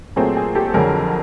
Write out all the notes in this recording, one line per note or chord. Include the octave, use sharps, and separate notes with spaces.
A#2 F#3 A3 C4 G#4
G#4
G4 A4
F2 D3 F#3 G#4 A#4